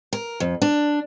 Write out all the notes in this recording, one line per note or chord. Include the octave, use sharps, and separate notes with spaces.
A#4
F2
D4